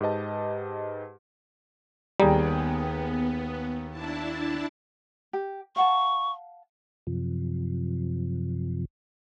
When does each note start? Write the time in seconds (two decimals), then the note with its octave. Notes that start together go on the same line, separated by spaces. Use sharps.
0.01 G#2 G4 B4 D#5 A5
2.20 D#2 G3 B3 G#4 G5 A#5
3.91 D4 E4 A5
5.33 G4
5.76 F5 F#5 A5 C#6
7.07 F#2 C3 F3